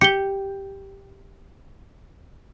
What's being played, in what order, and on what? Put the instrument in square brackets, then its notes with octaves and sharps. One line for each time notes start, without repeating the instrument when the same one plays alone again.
[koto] G4 [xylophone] C#7 G7